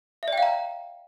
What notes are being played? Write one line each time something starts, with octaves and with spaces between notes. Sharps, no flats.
D5 E5 F5 G5 A#5